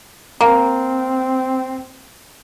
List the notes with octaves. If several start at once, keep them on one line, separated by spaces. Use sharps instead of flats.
A#3 C4 F5